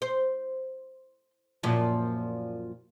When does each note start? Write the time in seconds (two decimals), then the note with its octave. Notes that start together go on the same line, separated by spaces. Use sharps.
0.02 C5
1.63 F#2 A#2 F3